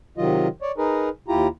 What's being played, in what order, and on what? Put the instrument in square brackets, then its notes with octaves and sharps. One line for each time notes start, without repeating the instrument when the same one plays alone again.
[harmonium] C3 D#3 F#3 F4 D#5
C#5 D5
D#4 G#4 A#4 B4
D#2 E4 F4 G4 A#5